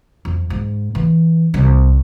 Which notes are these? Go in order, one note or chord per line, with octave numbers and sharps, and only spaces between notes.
F2
G#2
E3
C2